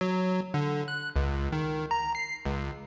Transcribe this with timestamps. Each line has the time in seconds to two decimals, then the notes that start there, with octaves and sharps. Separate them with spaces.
0.01 F#3
0.54 D3
0.88 F#6
1.16 C#2
1.52 D#3
1.91 A#5
2.15 C7
2.46 C#2